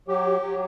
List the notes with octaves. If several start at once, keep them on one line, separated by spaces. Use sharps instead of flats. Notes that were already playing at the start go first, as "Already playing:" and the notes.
F#3 G4
F#3